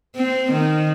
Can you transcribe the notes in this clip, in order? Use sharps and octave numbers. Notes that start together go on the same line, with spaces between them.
C4
D#3